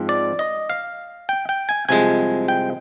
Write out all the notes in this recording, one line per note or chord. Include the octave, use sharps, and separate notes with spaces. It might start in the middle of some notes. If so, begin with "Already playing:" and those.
Already playing: G#2 F3 C4
D5
D#5
F5
G5
G5
G#5
C2 C3 F3 G#3 G#5
G5